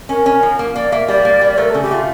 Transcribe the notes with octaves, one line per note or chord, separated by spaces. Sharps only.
C#4 A#4
C#4
F3
A#3
A#3 D5
A#3 E5
G3 D5
A#3
G3
A3 A#4
C#3 A4
G4
A3 F4